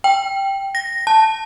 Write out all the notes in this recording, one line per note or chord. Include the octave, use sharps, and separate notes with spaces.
G5
A#6
A5